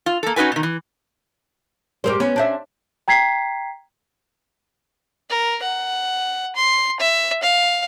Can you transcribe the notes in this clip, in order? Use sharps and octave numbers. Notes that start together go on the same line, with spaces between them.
F4
A#3 A4
C#4 D#4 F#4 B4 G#5
B2 D#3
E3
G#2 G3 G4 A#4 C5
B3 C#4
D4 C5 E5
G5 A#5 G#6 B6 C7
A#4
F#5
C6
E5
F5